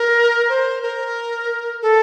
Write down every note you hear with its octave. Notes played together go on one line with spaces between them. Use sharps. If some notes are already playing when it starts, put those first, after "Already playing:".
Already playing: A#4
C5
A#4
A4